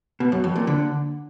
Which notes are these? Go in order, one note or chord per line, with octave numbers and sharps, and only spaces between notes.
B2
F#2
F2
A#2
D3